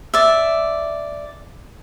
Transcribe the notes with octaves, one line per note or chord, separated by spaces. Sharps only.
D5 E5